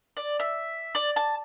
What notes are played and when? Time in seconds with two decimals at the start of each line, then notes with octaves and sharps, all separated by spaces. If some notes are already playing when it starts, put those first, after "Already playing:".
0.17 D5
0.40 E5
0.95 D5
1.16 A5